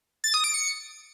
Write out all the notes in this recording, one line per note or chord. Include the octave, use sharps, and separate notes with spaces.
A6
D#6
D7
C#7